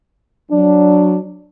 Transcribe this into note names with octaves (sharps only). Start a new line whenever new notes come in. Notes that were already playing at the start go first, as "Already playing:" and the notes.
F#3 D4